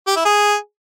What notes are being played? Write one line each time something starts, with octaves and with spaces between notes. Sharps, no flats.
G4
E4
G#4